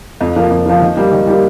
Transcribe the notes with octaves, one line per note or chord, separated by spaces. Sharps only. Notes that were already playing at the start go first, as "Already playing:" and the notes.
F2
F3 A#3
F2
F3 A#3
D#3
G3 A#3
D#3
G3 A#3